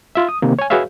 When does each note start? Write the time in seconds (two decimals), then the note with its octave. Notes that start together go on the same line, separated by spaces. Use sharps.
0.15 F4 E5
0.29 D#6
0.42 C3 D#3 A#3
0.59 C#5 G#5
0.70 F#4 G#4 B4 C#5 E5 F5